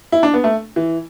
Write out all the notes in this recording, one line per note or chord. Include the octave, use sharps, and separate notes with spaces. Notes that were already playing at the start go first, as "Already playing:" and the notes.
E4
D4
B3
A3
E3